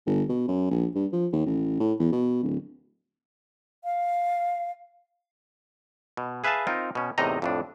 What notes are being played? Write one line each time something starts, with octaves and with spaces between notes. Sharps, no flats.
G1
B2
F#2
A#1
G2
F3
D#2
A1
A2
E2
B2
D1
F5
B2
G#4 B4 E5 F5 G#5 A5
C4 D#4 F4 A#4
B2 C#4
E2 A2 C3 D#4 D#5 A#5
F2 A2 D4